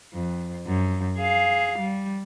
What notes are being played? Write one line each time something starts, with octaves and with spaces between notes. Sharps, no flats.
F2
F#2
G#4 F5
G3